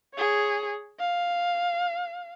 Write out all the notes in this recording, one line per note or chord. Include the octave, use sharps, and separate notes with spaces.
G#4 C#5
F5